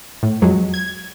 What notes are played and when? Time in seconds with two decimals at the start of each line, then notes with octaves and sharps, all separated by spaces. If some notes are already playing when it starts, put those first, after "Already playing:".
0.23 A2
0.42 F2 F#3 G#3
0.74 G#6